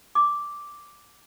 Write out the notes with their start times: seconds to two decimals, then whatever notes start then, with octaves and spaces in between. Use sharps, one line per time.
0.15 D6